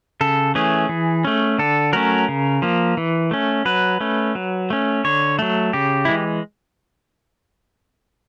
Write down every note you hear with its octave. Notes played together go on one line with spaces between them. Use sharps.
C#3 A4
E3 A3 C#4 G#4
E3
A3 C#4
D3 A4
F#3 A3 C#4 A#4
C#3
F3 A#3
E3
A3 C#4
F#3 B4
A3 C#4
F#3
A3 C#4
D3 C#5
F#3 A3
C#3 G4
E3 G#3 E4